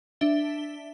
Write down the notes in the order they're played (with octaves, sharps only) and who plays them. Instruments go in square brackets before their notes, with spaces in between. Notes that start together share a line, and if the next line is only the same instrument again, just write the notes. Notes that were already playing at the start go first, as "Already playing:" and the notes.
[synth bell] D4 E5 G7